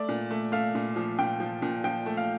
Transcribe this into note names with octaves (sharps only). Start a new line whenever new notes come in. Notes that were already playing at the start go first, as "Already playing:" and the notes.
Already playing: A3 D5
A#2
A3
A3 F5
A#2
F3
A#2 G5
F3
A#2
F3 G5
A3
F5